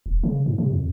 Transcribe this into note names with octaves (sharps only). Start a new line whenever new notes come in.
D#1
C#3
G#2
C3
F2